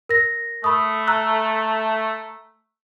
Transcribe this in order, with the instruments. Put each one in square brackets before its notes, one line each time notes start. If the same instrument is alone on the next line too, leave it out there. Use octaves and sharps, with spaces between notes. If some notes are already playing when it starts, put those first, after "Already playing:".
[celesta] A#4 A#6
[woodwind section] A3 [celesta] B5 D#6
[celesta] A#5 E6 F#6